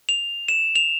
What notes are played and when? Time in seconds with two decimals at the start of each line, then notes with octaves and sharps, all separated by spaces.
0.09 F7
0.48 E7
0.76 F7